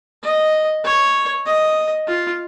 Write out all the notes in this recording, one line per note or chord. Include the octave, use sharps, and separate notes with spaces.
D#5
C#5
D#5
F4